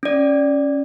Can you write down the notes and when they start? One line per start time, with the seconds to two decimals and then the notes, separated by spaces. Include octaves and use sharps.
0.03 C#4 D5